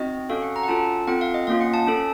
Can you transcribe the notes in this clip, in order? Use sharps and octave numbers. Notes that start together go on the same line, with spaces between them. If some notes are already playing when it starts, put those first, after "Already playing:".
Already playing: C4 D#4 F#4 D#5
C#4 F#4 A4 F5
F#5
A#5
F#5
C#4 F4 A4 A5
C4 F4 A4 F#5
F5
D#5
A#3 C#4 F4 F5
F#5
A5
C#4 A4